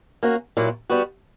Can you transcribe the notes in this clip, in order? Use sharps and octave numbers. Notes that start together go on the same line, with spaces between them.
A#3 C#4 F#4
A#2 F#3 A#3 E4
G3 B3 F#4